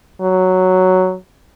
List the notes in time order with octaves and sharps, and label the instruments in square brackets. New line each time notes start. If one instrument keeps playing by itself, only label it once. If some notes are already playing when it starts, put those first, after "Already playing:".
[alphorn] F#3